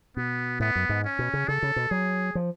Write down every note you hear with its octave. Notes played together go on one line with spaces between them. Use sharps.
B2 B3
A2 B3
F#2
G#2
C#4
B2
C#3
C#3 A4
C#3
B2
F#3 G#4
F3